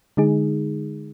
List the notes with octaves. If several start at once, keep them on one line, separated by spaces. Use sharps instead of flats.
D3 G#3 D#4 G#4